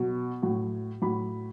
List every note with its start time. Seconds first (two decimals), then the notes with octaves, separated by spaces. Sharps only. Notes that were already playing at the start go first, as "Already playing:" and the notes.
Already playing: B2 F#3
0.43 A2 F#3
1.02 A2 F#3 B5